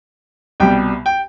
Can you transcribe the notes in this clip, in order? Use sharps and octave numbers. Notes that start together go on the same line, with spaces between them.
C2 B2 G3 G5
G5